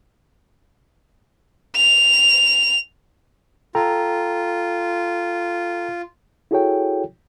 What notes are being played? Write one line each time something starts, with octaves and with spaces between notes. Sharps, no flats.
F7
F4 A4 G5 A#5
E4 F#4 G#4 A4 C#5 G5